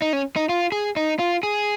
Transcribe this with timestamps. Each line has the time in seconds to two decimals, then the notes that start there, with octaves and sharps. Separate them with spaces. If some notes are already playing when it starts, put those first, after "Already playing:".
0.02 D#4
0.13 C#4
0.36 D#4
0.49 F4
0.72 G#4
0.96 D#4
1.19 F4
1.43 G#4